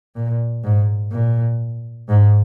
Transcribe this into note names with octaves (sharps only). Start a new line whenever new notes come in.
A#2
G#2
A#2
G#2